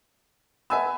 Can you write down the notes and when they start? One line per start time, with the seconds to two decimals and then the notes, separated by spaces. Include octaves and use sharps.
0.70 B3 E5 G#5 E6